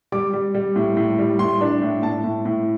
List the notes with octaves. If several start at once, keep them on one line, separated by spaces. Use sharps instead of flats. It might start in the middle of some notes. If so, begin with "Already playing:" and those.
G3 D6
G3
G3
A2
A2
G3
A2 C6
D4
A2
A2 A5
A2
A2